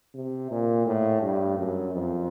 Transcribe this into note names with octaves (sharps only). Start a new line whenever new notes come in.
C3
A#2
A2
G2
F#2
F2